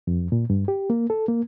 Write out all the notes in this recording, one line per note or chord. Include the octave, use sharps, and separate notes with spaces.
F2
A#2
G2
G4
A#3
A4
A#3